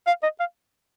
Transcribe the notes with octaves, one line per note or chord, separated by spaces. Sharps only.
F5
D#5
F5